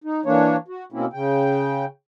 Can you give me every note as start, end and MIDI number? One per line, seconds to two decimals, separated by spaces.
0.04 0.21 63
0.25 0.56 52
0.25 0.56 58
0.25 0.56 62
0.25 0.56 73
0.68 0.85 66
0.92 1.06 47
0.92 1.06 58
0.92 1.06 60
0.92 1.06 61
0.92 1.06 64
1.13 1.85 49
1.13 1.85 79